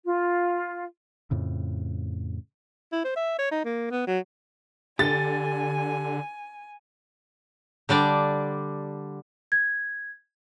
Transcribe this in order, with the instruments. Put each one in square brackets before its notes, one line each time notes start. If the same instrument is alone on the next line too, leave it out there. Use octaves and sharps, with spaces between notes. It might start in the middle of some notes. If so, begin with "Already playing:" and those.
[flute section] F4
[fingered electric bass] F2 A2 C#3
[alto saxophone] E4
C5
E5
C#5
D#4
A#3
B3
F#3
[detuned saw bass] D3 [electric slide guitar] G4 A4 [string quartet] G#5 [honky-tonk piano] A6
[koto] D3 G3 D4 D5
[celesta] G#6